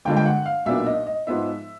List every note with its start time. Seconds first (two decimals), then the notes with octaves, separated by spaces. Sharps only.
0.05 G1 G2 D3 F3 G#3 G5
0.16 G5
0.26 F#5
0.46 F5
0.66 B1 A#2 F#3 B3 D4 E5
0.86 D#5
1.07 D#5
1.27 G#2 F3 G#3 B3 D#4 E5